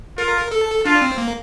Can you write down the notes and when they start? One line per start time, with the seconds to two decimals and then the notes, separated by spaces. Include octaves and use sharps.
0.18 F4 A#4
0.51 A4
0.85 D4 F4
1.02 C4
1.18 A#3